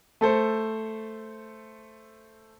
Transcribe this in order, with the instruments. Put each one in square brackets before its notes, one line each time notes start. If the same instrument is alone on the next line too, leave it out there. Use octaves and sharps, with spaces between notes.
[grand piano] A3 A4 C5